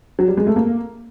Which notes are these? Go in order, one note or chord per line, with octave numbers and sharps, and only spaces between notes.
F#3
G3
G#3
A3
A#3